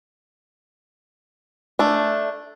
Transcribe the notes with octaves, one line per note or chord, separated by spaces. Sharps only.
A3 D4